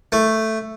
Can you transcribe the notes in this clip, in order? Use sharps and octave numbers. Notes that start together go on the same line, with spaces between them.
A3